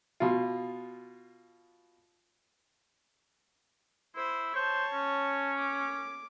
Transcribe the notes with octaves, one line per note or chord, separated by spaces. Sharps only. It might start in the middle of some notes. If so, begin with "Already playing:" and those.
B2 F4
E4 C5
C5 C#5 A5
C#4
D6